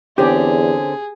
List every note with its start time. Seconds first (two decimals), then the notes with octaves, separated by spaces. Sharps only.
0.18 E2 D3 C4 C#4 G4 G#4